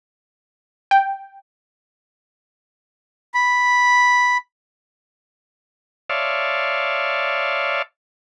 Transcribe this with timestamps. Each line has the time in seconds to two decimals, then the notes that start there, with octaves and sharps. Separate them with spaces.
0.91 G5
3.34 B5
6.10 C#5 D5 E5 F5 A5 C6